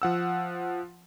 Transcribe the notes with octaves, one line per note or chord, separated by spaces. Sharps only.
F3 F#5 E6